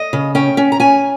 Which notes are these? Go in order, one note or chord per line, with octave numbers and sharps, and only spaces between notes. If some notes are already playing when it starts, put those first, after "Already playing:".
Already playing: D#5
C#3
C#4 G5
C#4
A#5
C#4 G#5